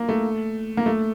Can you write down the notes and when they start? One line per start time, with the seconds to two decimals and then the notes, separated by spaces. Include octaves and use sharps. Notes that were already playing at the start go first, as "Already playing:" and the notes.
Already playing: A#3
0.09 A3
0.77 A#3
0.86 A3